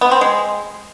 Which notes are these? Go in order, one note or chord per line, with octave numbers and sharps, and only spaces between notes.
B3
C4
G#3